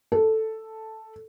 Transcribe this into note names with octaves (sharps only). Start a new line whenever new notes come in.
A4